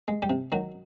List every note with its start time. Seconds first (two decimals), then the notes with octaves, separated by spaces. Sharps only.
0.08 G#3
0.22 G3 G4
0.30 C3
0.52 D#3 F#3 F#4